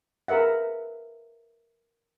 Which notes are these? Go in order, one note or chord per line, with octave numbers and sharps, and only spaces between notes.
G#4 A#4 B4 E5 F#5